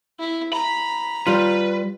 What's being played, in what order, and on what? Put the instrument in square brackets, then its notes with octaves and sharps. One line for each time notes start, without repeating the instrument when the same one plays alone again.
[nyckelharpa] E4
[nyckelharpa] A#5 [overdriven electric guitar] B5
[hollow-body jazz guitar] G3 F4 [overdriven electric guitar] B4